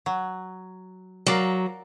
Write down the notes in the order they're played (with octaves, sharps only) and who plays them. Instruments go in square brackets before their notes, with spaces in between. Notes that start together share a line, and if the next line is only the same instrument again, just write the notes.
[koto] F#3
[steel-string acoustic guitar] F#3 [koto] A#4 D5 F5